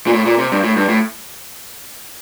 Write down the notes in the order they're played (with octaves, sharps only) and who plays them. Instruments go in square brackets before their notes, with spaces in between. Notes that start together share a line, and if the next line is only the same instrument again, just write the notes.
[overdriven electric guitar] A#2
A2
A#2
C3
G2
A2
G2
A2